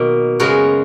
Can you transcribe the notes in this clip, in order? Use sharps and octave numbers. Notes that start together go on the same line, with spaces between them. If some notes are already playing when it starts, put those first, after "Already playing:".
Already playing: B2 D#3 F#3 A#3
F#2 C#3 G#3 B3 F#4 A#4